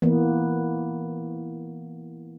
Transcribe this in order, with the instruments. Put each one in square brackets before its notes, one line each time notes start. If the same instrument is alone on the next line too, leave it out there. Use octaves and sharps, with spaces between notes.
[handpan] E3 A#3 B3